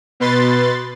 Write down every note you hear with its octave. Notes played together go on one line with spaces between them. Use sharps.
B2 B4 C6 A6